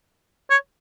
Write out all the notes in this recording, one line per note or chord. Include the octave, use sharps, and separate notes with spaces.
C#5